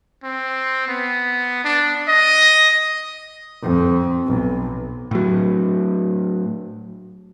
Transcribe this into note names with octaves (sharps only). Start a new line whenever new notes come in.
C4
B3
D4
D#5
F2
B1
A2 F#3